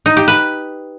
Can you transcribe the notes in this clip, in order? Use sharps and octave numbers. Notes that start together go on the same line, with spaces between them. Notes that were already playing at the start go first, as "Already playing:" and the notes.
D#4
G4
B4